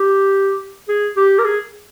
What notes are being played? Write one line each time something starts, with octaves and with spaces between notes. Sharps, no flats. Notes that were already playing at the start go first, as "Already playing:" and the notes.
Already playing: G4
G#4
G4
A#4
G#4